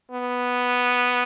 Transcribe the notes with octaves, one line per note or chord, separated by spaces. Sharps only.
B3